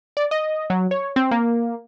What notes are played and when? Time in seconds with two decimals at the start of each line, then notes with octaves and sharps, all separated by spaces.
0.17 D5
0.31 D#5
0.70 F#3
0.91 C#5
1.16 C4
1.31 A#3